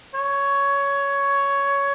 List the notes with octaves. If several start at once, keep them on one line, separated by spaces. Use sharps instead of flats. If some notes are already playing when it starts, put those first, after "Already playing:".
C#5